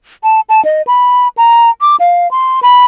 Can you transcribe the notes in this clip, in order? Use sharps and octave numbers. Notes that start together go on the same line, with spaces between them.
A5
A5
D#5
B5
A#5
D6
F5
C6
B5